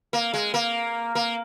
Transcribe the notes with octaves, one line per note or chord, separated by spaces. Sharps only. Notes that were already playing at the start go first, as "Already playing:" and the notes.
A#3
G#3
A#3
A#3